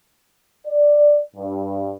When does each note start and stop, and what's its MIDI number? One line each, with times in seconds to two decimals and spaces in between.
0.67 1.20 74
1.36 1.94 43